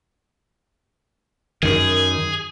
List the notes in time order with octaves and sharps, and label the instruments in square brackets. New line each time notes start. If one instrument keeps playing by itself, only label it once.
[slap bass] F#2 D#3 [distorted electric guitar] G#4